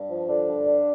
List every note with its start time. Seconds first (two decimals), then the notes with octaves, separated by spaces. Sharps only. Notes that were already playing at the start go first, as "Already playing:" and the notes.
Already playing: G2
0.09 F3
0.28 D3 D4
0.48 G2
0.67 G2